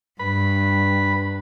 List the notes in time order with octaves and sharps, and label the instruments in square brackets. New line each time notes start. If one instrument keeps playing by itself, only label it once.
[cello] G2 [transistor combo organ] B4 B5